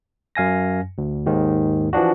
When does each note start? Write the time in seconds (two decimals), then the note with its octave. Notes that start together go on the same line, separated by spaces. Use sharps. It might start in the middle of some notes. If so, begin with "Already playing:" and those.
0.35 F#2 F5 G#5 A#6
0.98 D2
1.26 D#2 G#2 D#3
1.93 E3 F3 D4 F#4